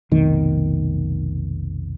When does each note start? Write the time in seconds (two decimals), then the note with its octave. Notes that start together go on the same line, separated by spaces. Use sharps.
0.11 F1 B1 D#3